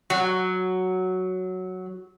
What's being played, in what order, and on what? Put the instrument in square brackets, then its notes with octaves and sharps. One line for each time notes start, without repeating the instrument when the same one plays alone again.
[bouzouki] F#3 [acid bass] F#4